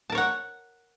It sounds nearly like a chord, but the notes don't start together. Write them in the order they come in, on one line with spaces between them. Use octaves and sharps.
A5 A#4 C#5 F#5